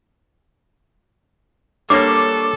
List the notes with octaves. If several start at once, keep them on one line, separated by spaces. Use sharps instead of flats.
G3 A#3 D4 A4 C#5 D6